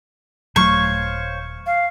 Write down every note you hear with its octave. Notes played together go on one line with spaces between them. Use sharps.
D#1 F#3 A3 C5 C#5 F5 C#6
F5